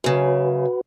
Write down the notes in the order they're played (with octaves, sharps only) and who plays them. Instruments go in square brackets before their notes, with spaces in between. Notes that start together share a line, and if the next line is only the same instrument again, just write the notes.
[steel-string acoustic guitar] F#2 C#3 [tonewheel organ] F#4 B4